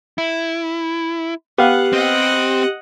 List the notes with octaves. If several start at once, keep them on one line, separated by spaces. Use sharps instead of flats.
E4
B3 G4 F5 F#5
C4 D#5 F#5